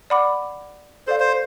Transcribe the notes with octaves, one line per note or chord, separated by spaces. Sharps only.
D5 F#5 B5 D6
A4 C5 D5 F5
C5